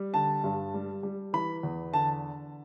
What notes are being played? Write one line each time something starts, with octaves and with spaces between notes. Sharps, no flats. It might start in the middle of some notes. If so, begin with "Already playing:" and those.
Already playing: G3
D3 A5
G2
G3
G3
E3 B5
E2
D3 A5